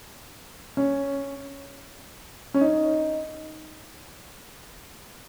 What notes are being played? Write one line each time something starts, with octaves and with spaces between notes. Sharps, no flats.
C#4
C#4
D#4